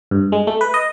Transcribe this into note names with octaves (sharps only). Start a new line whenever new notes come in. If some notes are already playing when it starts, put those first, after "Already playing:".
G2
G#3
A3
B4
D#5